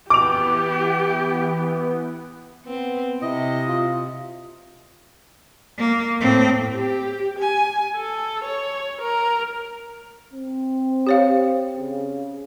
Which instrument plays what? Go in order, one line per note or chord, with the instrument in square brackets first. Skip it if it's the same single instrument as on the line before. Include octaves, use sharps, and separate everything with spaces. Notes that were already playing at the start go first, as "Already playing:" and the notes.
[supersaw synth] E3 B3 [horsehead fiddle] G4 [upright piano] D6 F7
[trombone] B3 [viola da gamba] C4
[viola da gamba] C3 [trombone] E4 [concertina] D#5
[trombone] F4
[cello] A#3
A2 C4
[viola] G4
G#5
A4
C#5
A#4
[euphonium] C4
[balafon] G4 C#5 F5
[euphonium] C#3